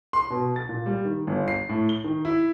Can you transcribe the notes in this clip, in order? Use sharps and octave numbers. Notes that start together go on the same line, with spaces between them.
C6
B2
A6
A#2
G3
D#3
G1
C7
A2
G7
D#3
E4